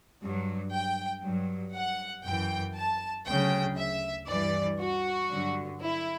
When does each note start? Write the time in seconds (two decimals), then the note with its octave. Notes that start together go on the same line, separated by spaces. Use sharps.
0.21 G2 F#3
0.72 G5
1.23 G2 F#3
1.74 F#5
2.24 F#2 E3 G5
2.75 A5
3.26 D2 C#3 F#3 G5
3.77 E5
4.28 G2 E3 D5
4.80 F#4
5.30 G2 D3 F#3
5.81 E4